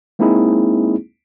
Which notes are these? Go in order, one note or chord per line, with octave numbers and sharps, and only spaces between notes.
G#3 A#3 C4 D#4 E4 G#4